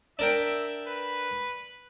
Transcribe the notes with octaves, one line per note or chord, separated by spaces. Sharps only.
D4 A#4 E5 G5
B4